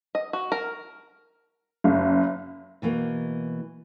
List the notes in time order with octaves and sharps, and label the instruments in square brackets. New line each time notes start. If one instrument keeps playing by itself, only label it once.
[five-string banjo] D#5
F#4
A#4
[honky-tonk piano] F#1
[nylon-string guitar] B2 E3 A#3